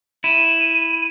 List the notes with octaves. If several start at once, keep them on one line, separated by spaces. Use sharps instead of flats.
E4 D#7